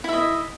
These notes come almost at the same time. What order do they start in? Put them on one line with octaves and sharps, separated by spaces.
E4 E5 D#5